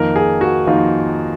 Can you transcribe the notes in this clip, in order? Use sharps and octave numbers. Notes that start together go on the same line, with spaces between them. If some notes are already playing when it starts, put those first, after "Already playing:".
Already playing: F2 D#3 A#3 D#4 A#4
G#4
F#4
F2 D#3 A#3 D#4 F4